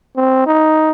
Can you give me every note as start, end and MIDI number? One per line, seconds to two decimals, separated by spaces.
0.17 0.46 60
0.47 0.91 63